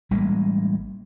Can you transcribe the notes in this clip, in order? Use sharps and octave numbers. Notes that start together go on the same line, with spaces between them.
A1 G3 G#3 A#3